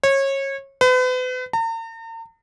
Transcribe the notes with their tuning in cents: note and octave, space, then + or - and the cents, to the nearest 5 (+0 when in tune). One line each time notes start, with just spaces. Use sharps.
C#5 -25
B4 +40
A#5 -45